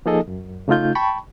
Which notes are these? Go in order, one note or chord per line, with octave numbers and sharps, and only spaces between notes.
F3 A#3 D#4 G#4 A4 D#5
F#2
C#3 A3 D#4 F4 G6
G5 A5 B5 C#6